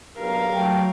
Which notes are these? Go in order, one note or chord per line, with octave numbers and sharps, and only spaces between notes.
B1 G2 A#4 F5
F#3 A3 G5